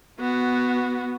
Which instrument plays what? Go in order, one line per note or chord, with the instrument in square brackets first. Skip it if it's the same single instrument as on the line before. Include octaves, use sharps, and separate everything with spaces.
[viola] B3 F#4